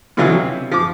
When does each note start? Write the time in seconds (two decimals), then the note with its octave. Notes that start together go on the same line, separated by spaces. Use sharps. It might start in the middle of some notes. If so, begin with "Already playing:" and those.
0.17 B2 D3 E3 F#3 F4
0.29 C3
0.71 F3 D6